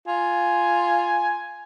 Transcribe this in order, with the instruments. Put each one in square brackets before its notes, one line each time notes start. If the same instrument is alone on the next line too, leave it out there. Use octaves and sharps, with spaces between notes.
[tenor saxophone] F4 [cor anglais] G#5